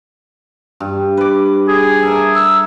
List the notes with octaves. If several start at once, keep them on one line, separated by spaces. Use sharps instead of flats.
G2
B4 D6
G#4
A4 A#4 E5
E6